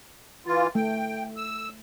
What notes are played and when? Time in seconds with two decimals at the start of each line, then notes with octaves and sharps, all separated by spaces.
0.46 E3 F4
0.75 A3 G5
1.36 E6